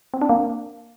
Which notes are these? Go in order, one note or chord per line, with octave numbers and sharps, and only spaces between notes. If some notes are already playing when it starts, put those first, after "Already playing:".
C4
D4
A#3